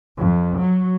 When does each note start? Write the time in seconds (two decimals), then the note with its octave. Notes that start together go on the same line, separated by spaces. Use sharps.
0.20 F2
0.62 F#3